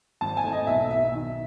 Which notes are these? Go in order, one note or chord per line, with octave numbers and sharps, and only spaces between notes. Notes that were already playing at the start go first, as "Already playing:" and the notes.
G#1 A5
G#5
A3
D#5
B1 E5
B1 E5
D#3